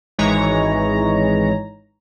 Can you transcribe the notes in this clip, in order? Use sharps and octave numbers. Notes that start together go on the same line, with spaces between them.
G#1 E3 G#3 D#4 C#5 A#5